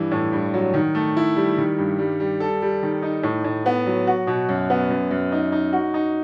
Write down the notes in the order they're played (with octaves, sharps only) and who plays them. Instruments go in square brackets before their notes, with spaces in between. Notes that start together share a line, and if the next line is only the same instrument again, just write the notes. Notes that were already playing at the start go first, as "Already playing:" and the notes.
Already playing: [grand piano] G2 E3
A2
G2
F#3
D#3
A3
E4
G3
D#3
G2
G3
G3
A4
G3
D#3
D#4
A2
A2
B3
F#3
F#4
B2
F#2
B3
F#2
F#2
D#4
D#4
F#4
D#4